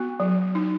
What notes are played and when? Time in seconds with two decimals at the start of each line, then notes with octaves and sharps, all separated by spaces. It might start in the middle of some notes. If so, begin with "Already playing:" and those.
Already playing: B3 F#4
0.20 F#3
0.55 D#4